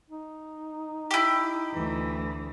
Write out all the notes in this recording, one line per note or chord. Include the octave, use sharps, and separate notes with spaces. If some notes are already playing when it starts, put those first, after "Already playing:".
D#4
E4 G4
D2 E3